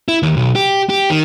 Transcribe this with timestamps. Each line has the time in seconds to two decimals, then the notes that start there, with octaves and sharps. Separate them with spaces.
0.08 E4
0.23 D#2
0.37 B1
0.56 G4
0.89 G4
1.10 D#3